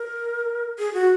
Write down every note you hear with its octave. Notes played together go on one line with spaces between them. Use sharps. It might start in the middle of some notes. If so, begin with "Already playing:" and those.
Already playing: A#4
G#4
F#4